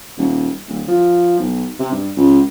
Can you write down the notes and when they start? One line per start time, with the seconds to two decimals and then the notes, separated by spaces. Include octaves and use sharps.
0.18 D#1
0.68 D1
0.88 F3
1.39 B1
1.80 C3
1.92 G2
2.17 C#2